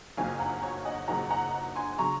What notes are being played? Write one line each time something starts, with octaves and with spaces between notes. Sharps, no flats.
F#1 F2 D#3 F#3 F5 G#5
F#5 A#5
C#5
D#5 F#5
F#1 F2 D#3 F#3 F#5 A#5
F#5 A#5
G#5 C6
C#3 F#3 A#5 C#6